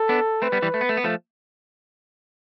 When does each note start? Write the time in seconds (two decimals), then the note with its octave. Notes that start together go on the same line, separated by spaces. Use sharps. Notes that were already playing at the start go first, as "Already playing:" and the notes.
Already playing: A4
0.09 B3 D4
0.42 A3 C4 B4
0.52 G3 B3
0.62 E3 G3
0.74 A3
0.81 B3
0.89 A3
0.97 B3
1.04 F3 A3